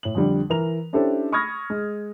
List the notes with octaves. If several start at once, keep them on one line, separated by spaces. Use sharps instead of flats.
A2 F#7
F2 D3 G3
E3 A#4 A#5 F7
C#4 D4 E4 G4 A4 C5
B5 C#6 D#6 F6 G#6 A#6
G#3